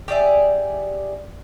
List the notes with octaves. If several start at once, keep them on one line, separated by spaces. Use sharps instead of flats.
G4 G#4 D5 E5